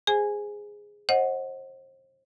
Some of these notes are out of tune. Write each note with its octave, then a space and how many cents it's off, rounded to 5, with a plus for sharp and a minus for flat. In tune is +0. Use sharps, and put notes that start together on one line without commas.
G#4 -10 C5 -5 G#5 +0
C5 +35 D#5 +0 F#5 +0